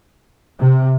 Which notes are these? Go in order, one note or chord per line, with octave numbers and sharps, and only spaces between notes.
C3